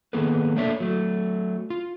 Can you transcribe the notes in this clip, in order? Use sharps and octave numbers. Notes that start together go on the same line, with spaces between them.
D#3 A#3 B3 G#4 A4 B4
A3 A#3 D4 A4 C#5 E5
F#3 A3
F4